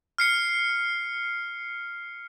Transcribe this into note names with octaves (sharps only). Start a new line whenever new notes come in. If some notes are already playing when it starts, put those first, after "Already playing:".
F6 C7 C#7